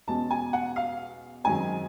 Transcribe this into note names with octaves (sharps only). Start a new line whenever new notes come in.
E2 B2 G#3 C#4 A5
G#5
F#5
F5
F#2 D#3 G#3 C4 G#5